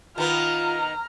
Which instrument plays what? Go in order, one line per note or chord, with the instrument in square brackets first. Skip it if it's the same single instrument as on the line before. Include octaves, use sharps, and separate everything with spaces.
[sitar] D#3 B3 [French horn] F4 [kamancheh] A#5 F6